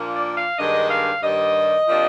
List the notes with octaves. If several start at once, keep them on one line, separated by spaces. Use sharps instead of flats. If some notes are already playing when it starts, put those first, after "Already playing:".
Already playing: A#2 F3 A#3 D4
D5
F5
G2 D#3 G#3 D4 D#5
F5
G2 D#3 G3 D#5
C3 F3 A#3 D4